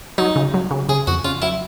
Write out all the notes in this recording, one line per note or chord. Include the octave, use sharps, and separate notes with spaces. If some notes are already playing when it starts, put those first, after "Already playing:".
F#3 D#4
C#3
F#3
C#3
C#3 G#4
F2 F#4
C#3 F4
F#3 E4